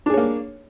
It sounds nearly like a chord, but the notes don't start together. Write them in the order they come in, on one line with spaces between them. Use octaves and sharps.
D4 G#4 C#5 A#3